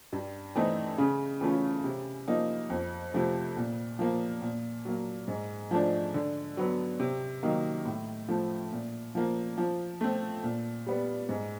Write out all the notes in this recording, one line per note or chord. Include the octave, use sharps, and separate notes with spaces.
G2
E3 A3 C4 D#4
C#3
E3 A3 C#4 F4
C3
F3 A#3 D#4
F2
C3 F3 A3
A#2
F3 A#3
A#2
F#3 A#3
G#2
F3 A3 D4
D3
F#3 B3
C3
D#3 F#3 A#3 D#4
A2
F3 A3
A#2
F3 A#3
F3
A3 C4
A#2
G3 B3
G#2